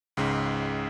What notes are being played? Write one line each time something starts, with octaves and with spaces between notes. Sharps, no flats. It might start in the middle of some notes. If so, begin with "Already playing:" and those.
C#2 G#2 C#3